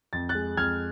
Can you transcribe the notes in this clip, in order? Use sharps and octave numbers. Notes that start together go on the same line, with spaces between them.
F2 A6
F#6 A6
G#3
F2 F6 G#6